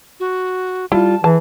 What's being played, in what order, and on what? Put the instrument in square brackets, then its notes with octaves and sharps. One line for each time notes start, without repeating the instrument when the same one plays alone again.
[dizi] F#4
[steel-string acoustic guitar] G3 F4 [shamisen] E4 [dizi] A5
[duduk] E3 [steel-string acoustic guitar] G#4 [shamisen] A5